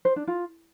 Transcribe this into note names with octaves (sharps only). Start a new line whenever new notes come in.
C5
D4
F4